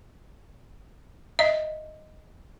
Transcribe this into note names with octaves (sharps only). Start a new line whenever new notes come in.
D#5 E5